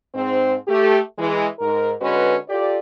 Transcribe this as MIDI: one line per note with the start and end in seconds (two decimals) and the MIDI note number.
0.14 0.55 44
0.14 0.55 60
0.68 0.99 57
0.68 0.99 67
1.18 1.45 52
1.18 1.45 56
1.60 1.91 44
1.60 1.91 70
2.00 2.36 50
2.00 2.36 56
2.00 2.36 61
2.00 2.36 66
2.00 2.36 71
2.48 2.78 65
2.48 2.78 67
2.48 2.78 69
2.48 2.78 74